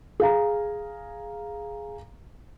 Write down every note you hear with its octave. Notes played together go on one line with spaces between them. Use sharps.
G#4 F5 A#5